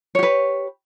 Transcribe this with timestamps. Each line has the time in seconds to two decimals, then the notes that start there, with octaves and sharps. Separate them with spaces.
0.15 C#5
0.19 G4
0.23 B4